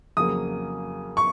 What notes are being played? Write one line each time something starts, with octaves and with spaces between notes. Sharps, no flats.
F2 C#3 F#3 A#3 D#6
C#6